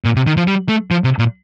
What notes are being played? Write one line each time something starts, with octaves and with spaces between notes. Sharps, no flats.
A#2
C3
D#3
F3
G3
A3
F3
C3
A#2